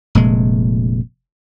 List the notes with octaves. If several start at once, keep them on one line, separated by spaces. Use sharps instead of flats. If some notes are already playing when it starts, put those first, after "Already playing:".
F1 A#2 G#3